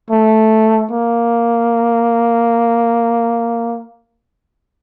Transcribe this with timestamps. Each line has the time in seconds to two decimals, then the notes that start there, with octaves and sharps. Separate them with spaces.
0.11 A3
0.91 A#3